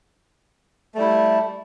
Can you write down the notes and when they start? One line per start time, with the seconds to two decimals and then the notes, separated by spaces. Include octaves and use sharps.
0.94 A3
0.97 G3
1.00 E4